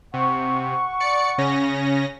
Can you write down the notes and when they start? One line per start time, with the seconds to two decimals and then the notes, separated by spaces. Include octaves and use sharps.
0.14 C3 F#5 C#6
1.00 D5 C#7
1.38 C#3 C#4 A#6